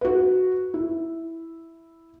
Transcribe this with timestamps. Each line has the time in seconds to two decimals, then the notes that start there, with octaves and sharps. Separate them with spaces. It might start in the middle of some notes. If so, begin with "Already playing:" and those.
0.01 F#4 B4
0.74 E4